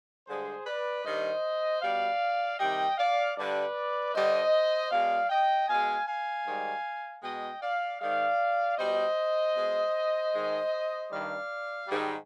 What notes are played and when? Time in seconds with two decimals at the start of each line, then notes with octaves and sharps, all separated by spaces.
0.27 G2 D3 G#3 G#4 C5
0.66 B4 D5
1.04 G2 D#3 G3 C5 D#5
1.81 B2 G3 D5 F5
2.59 C3 D#3 G3 D#5 G5
2.98 D5 F5
3.36 G2 D3 G3 B4 D5
4.14 G2 D3 G3 C5 D#5
4.91 B2 G#3 D5 F5
5.30 D#5 G5
5.69 B2 G#3 F5 G#5
6.08 F5 G#5
6.46 G#2 D#3 G3
7.23 B2 G#3 D#5 G5
7.62 D5 F5
8.01 G#2 D#3 G#3 D5 F5
8.78 B2 G3 C5 D#5
9.55 B2 G#3
10.33 G#2 D#3 G#3
11.10 G2 D#3 G3 D5 F5
11.88 G#2 D#3 G3